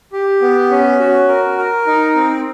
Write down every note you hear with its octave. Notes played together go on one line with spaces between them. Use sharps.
G4
B3
C#4
F#4
A#4
A#4
D#4
C4